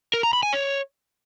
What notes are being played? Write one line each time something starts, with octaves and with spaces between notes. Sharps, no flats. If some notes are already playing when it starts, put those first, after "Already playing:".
A#4
A#5
B5
G#5
C#5